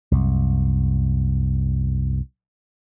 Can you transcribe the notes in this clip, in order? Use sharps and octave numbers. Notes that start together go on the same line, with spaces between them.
C2 F#2